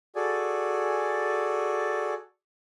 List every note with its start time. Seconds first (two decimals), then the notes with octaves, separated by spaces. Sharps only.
0.16 F#4 G#4 A4 D5 G#5